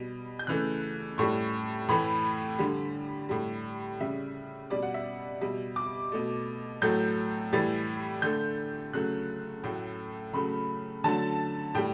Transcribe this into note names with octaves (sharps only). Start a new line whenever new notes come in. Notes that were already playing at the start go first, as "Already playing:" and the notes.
Already playing: B2 G3
G6
C#3 E3 A3 F#6
A2 G3 C#6
A2 E3 A3 B5
D3 G3
A2 G3
C#3 G3 E5
B2 G3 D5
F#5
E5
B2 G3
D6
B2 A3
A2 F#3 A3 G6
A2 E3 G3 A6
D3 A3 G6
C#3 F#3 A3 F#6
A2 F#3 A3 G5
C#3 F#3 A3 B5
D3 F#3 A3 A5
A2 G3 G5